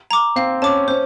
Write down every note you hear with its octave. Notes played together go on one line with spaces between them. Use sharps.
A#5 D6
C4 F5
C#4 A5 D6
C#4 C5